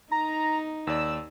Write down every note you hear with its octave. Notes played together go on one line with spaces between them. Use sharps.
D#4 A#5
D#2 D5 E6